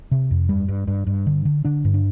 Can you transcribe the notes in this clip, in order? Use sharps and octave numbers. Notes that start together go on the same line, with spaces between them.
C3
F2
G2 G3
G2
G2
G2
D3
D3
D3 D4
G2
D4